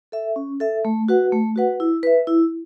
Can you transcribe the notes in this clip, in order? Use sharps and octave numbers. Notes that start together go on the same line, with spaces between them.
A4 E5
C#4
A4 E5
A3
F#4 B4 F#5
A3
F#4 B4 F#5
E4
B4 E5
E4